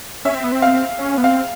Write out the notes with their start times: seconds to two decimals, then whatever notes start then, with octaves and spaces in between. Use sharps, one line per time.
0.25 C#4 E5
0.35 C4
0.44 B3
0.52 C4
0.62 F5
0.99 C#4
1.18 B3
1.24 C4 F5